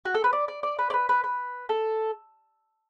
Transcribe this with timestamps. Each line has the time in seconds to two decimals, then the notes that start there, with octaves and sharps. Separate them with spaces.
0.05 F#4
0.14 A4
0.24 B4
0.33 D5
0.48 D5
0.63 D5
0.79 B4
0.90 D5
0.94 B4
1.09 B4
1.24 B4
1.69 A4